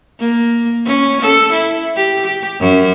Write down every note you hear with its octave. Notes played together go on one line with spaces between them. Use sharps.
A#3
C#4
A4
E4
G4
G4
F#2